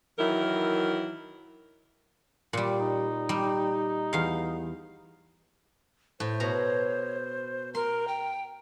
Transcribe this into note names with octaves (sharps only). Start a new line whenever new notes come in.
D#3 E3 F#3 E4 A#4
A#2 G3
D#4
G3
E2 F5
A2 C5
B2 C#5 A#5
A#4 A#5 C6
G5